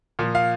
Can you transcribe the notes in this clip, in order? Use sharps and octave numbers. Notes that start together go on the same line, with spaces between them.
A#2 F3
F5